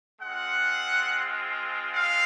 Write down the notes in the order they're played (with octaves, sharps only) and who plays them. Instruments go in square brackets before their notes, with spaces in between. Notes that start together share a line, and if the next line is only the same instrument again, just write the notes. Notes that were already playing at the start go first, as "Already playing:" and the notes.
[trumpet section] G#3 C4 F4 F#5
F5